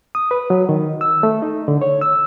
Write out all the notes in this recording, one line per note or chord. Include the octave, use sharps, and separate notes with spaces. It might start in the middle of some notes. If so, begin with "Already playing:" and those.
D#6
B4
F#3
D#3
E6
A3
D#4
D3
C#5
E6